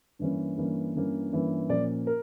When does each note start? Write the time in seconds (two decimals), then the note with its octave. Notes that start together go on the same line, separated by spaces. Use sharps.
0.19 G2 E3 A#3 C#4
0.57 G2 E3 A#3 C#4
0.95 G2 E3 A#3 C#4
1.32 G2 E3 A#3 C#4
1.69 A#2 F3 A#3 C#4 D5
2.07 A#4